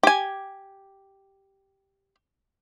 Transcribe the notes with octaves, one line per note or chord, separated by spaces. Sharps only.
G4 G#5